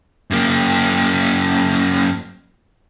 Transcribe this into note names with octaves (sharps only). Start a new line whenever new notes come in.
F#2 A#3